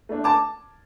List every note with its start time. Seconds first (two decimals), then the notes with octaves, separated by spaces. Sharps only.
0.09 A3 D4
0.24 A5 D6